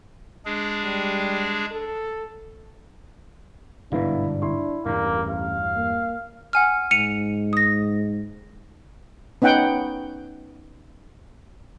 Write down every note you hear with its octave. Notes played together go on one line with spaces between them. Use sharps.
G#3 D4 G#4
G3
A4
G1 G#2 B2 B3 D4 E4 F5
E4 C6 C#6
A1 E2 G2 A#3 D4
F5
A#3
F#5 G#5 F6
G#2 C#7 D#7 F7
D#6 A#6
B3 C#4 D#4 F#5 G5